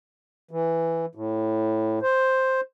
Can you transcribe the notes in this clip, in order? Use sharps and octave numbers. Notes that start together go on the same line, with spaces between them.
E3
A2
C5